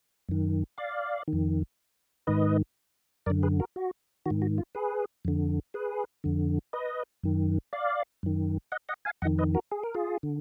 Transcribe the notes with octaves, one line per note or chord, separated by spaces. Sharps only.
F#2 D#3
D5 F5
D#3
F2
G#2 D#3 B4 D#5
F#2 D3 A#4 D5
G#4 B4
F#4 A#4
F#4
G#2 D#3 F#4
F#4
F4
G#4 B4
F2 D3
G#4 B4
F2 D3
B4 D#5
F#2 D#3
D5 F5
F#2 D#3
D#5 F#5
D#5 F#5
F5 G#5
F2 D#3 D#5 F#5
B4 D#5
F#4 A#4
G#4
A#4
F4 G#4
D3